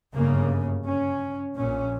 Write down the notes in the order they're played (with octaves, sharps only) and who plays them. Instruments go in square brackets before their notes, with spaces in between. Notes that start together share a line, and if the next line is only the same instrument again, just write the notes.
[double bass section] G1 F#2 C#3 A#3
C#4
A#1 A#2 C#4